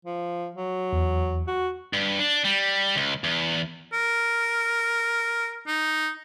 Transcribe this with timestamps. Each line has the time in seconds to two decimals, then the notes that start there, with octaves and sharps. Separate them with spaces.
0.05 F3
0.55 F#3
0.93 E2
1.48 F#4
1.93 G2
2.19 D4
2.44 G3
2.96 C#2
3.24 E2
3.93 A#4
5.67 D#4